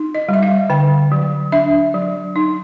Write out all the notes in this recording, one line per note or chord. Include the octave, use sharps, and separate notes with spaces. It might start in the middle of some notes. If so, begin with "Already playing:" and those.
Already playing: D#4
D#5
G3
E5
F5
D3 G5
F#3
D4 E5
F#3
D#4